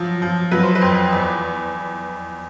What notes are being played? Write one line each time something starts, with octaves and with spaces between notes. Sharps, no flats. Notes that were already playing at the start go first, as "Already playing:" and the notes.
Already playing: F3 F#3
F3
F#3 B4
C5
B4
F2
E2